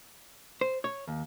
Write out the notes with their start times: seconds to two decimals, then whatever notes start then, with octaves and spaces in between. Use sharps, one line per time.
0.61 C5
0.84 C#5
1.07 D#2